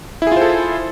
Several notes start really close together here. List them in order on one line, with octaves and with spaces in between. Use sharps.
E4 G#4 F4 C5 A4